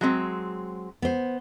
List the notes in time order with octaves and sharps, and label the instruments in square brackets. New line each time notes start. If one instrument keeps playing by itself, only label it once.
[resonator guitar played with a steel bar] F#3 G#3 C4
[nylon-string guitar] B3 C5